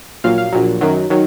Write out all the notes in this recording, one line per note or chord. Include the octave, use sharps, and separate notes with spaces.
A#1 A#2 F#3 F5
F5
A#1 A#2 F#3
F#2 D#3 F#3
D#3 F#3